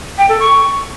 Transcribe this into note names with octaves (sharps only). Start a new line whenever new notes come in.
G5
A4
C#6